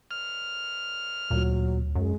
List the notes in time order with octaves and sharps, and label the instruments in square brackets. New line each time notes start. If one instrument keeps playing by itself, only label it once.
[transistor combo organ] F6
[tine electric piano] D2 [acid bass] A#2 [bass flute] F#3
[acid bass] F#2 [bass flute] G#3